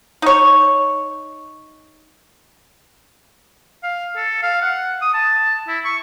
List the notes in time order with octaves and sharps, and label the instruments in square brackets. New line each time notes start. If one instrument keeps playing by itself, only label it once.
[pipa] D#4 C#5
[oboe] F5
A4
F5
F#5
D#6
A5
E4
C#6